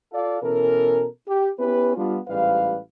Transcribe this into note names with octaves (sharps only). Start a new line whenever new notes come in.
F4 A4 D5 F5
B2 E3 C#4 A4 A#4
G4
B3 C#4 E4 G4 B4
G3 B3 D4 F4
A1 G#2 G3 B4 F5